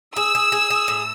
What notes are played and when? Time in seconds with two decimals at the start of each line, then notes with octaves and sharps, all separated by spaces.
0.16 G#4 E6
0.35 G#4
0.52 G#4
0.70 G#4
0.88 A2